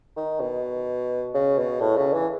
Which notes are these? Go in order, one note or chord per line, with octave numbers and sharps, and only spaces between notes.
D#3
B2
C#3
B2
A2
C#3
E3